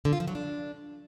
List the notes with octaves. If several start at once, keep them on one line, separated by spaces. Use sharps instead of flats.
D3
F4
F3
F#3
D4